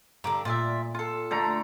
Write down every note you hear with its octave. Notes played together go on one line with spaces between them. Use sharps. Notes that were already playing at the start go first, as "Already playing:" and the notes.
G2 D3 A#5 D6
A#2 F4 D5 E5
F4 A4
D3 A3 A#5